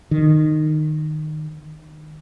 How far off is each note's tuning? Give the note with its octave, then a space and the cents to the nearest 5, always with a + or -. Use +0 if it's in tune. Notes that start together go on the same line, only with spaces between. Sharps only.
D#3 -15